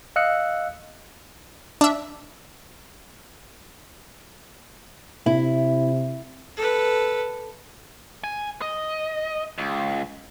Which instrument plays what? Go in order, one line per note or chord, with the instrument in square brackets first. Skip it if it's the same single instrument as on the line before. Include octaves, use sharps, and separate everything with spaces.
[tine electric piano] D#5 F5 E6 F#6 C#7
[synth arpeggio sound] D4 E5
[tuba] C3 [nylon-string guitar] E4
[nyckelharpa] A4 B4
[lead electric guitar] G#5
D#5
C#2